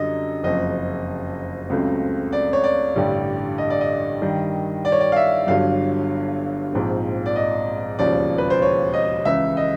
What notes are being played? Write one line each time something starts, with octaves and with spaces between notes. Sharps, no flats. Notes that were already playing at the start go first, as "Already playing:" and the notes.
Already playing: F#2 D3 G3 D#5
F#1 F2 C#3 D#5
C#2 C#3 F#3 A3 C4
D5
C#5
D5
A1 G2 D3 G3
D#5
D5
D#5
G2 D#3 G3
D5
C#5
D5
F5
E5
G1 G2 D3 F#3 F5
A#1 G#2 F3 G#3 C4
D5
D#5
E1 D#2 C#3 F3 D5
B4
C5
C#5
D#5
C#2 C#3 E3 E5
D#5